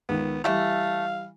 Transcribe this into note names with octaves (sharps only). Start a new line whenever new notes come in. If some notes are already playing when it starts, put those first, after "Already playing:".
C#2 D#3 B3
E3 G3 A3 G4 E5 F5